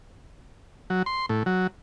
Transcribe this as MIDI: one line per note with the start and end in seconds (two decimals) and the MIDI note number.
0.90 1.03 54
1.06 1.26 84
1.29 1.43 45
1.46 1.67 54